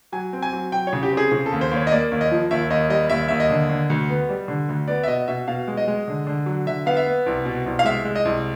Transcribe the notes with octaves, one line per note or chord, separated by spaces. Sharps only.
F#3 G#5
C4
G#5
F#3
F#3 G5
C#5
C#3
G4
C4
G#4
C#3 G#4
A4
D#2
C5
D#2 C#5
D#5
A#3 D5
D#2
D#5
F3
D#2 E5
D#2 D#5
G3 D#5
D#2 E5
D#2 E5
D#5
D3
D3
D2
B3
G3
D3
D2
B3 D5
E5
B2 D#5
B2 E5
B2 F5
G#3
D#5
G#3
D3
D3
F#3
D3 E5
B3 F5
E5
B3
C2
B2
C2
F5
G#3 E5
G#3
D#5
C2